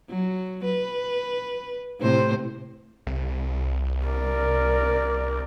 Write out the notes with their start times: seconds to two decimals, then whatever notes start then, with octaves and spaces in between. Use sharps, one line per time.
0.10 F#3
0.65 B4
2.00 A2 C3 C5
3.07 C2
4.06 A#4 D5